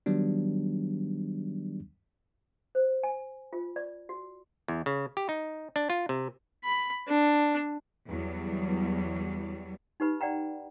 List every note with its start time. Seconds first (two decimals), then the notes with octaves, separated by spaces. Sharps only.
0.06 D#3 F#3 G3 B3 D4
2.75 C5
3.03 G#5
3.53 F4
3.76 D5
4.09 F#4
4.68 E2
4.86 C#3
5.17 G4
5.29 D#4
5.76 D4
5.90 F4
6.09 C3
6.65 B5
7.08 D4
8.08 E2 F#3 G3
10.00 D#4 G4 B4 B5
10.21 D5 F#5 G5 A#5